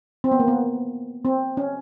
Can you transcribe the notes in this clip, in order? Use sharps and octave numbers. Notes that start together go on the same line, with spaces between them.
C4
B3
A#3
B3
C4
C#4